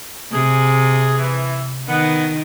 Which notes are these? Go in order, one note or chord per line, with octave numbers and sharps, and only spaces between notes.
C3 G#4
E3
D#3 B3